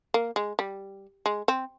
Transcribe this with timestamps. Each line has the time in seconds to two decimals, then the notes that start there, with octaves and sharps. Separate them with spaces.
0.14 A#3
0.36 G#3
0.59 G3
1.26 G#3
1.48 C4